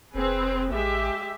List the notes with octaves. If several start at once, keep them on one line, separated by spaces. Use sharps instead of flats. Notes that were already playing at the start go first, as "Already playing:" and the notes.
F1 C4 G#4 B4
A1 G#3 G4 E5